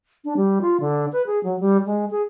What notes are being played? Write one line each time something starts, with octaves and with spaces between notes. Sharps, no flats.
D4
G3
F4
D3
B4
G#4
F#3
G3
G#3
G#4